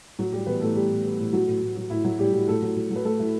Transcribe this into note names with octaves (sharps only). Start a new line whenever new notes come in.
A2 F#3 F#4
A2 G3 G4
E3 B3 B4
A2 A3 A4
G3 G4
A2
G3
A2
F#3 F#4
A2
A2
F#3
A2 E4
A2 F#3 F#4
A2 G3 G4
F#3
A2 A3 A4
F#3
F#3
F#3
B4
F#3 A3 A4
F#3 E4